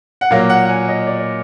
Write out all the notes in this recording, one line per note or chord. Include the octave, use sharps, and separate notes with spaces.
F#5
A#2 F#3 A#3 F5
F#5
F#5
G#5
D#5
D5